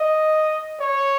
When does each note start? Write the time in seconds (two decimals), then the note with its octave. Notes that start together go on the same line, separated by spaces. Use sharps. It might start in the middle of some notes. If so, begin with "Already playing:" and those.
Already playing: D#5
0.81 C#5